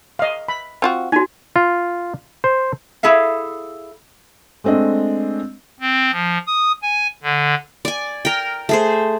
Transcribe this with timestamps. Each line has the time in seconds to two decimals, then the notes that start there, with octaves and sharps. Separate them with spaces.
0.19 D#5 F5
0.48 B5
0.82 C4 F4 F#4
1.12 D#4 F#4 G#5
1.56 F4
2.44 C5
3.03 E4 G#4 A4 E5 F5
4.64 G#3 A3 C4 D4 D#5
5.80 C4
6.11 F3
6.47 D#6
6.83 G#5
7.23 D3
7.85 D5 G#5
8.25 A#4 G5
8.69 A3 G#4 C5